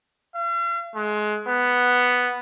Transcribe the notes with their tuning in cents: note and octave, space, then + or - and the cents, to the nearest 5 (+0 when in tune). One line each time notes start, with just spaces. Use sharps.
F5 -45
G#3 +25
B3 +0